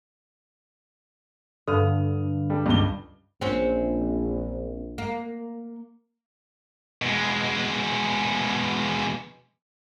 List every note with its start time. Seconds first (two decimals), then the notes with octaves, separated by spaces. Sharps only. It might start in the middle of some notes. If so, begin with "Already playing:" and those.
1.68 G2 D3 D#6 F6
2.50 G3 A4
2.66 C#2 G2 G7
3.41 A#1 C4 C#4
4.98 A#3
7.02 B2 G#3